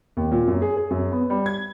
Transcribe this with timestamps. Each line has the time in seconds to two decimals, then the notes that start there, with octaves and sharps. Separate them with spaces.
0.17 D#2
0.32 A#2
0.47 F#2
0.62 G#4
0.76 G#4
0.90 F#2
1.12 B3
1.30 G3
1.46 G#6